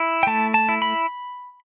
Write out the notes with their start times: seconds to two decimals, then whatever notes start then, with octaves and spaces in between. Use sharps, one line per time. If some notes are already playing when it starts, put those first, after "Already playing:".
Already playing: E4
0.23 G5
0.27 A3 A5
0.54 A5
0.69 E4
0.82 B5